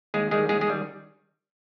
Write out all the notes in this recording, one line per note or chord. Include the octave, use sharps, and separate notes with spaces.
D#2 G#3 G#4
D#3 G3 G#3 G#4
D#2 G#3 G#4
G#3 G#4
D#3 G3